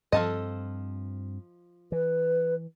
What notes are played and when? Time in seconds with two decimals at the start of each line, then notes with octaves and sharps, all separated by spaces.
0.12 G2 F3 C4 A4 D#5
1.92 E3 B4